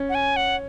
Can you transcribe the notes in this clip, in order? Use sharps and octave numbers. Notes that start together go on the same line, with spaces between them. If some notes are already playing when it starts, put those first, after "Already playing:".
Already playing: C#4
F#5
G#5
F#5